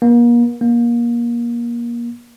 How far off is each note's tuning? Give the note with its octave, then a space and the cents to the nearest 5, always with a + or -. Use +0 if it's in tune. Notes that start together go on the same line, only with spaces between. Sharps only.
A#3 +35
A#3 +25